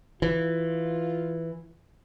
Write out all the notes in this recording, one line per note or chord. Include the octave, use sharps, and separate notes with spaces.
E3 F4